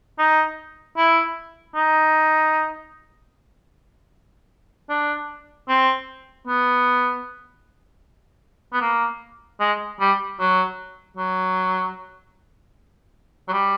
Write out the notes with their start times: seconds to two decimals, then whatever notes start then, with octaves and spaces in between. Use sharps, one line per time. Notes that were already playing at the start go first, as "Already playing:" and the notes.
0.18 D#4
0.97 E4
1.75 D#4
4.89 D4
5.69 C4
6.47 B3
8.73 B3
8.81 A#3
9.60 G#3
10.00 G3
10.39 F#3
11.17 F#3
13.48 F#3
13.53 G3